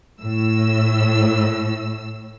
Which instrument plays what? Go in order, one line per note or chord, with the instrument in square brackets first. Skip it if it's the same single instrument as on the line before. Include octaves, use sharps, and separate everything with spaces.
[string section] A2 E6